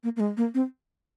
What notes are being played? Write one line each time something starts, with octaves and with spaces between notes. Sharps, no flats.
A#3
A#3
G#3
A#3
C4